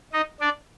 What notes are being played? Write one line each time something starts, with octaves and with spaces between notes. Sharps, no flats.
D#4 D#5
D4 D5